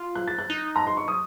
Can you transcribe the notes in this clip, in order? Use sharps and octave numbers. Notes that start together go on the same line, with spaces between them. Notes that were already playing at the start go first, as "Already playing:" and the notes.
Already playing: F4
F#6
A6
F#6
D#4
A#5
C6
C#6
D#6